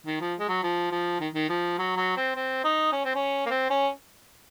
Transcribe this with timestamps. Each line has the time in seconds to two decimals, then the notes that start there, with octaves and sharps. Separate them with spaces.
0.06 D#3
0.21 F3
0.39 G#3
0.48 F#3
0.63 F3
0.92 F3
1.20 D#3
1.35 D#3
1.49 F3
1.79 F#3
1.97 F#3
2.17 C4
2.36 C4
2.64 D#4
2.92 C#4
3.05 C4
3.15 C#4
3.46 A#3
3.50 C4
3.70 C#4